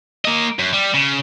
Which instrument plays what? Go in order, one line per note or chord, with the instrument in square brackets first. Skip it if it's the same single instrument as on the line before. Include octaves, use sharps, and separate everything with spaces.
[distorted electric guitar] A#3 D#5
F#2
G3
C#3